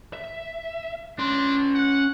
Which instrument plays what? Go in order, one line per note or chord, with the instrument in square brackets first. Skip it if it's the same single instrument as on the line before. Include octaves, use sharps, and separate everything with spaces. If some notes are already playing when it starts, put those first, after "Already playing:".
[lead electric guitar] E5
[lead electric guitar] C#4 C6 [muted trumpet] D4
[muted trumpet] F#5